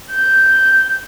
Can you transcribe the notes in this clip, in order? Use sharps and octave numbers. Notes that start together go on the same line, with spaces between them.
G6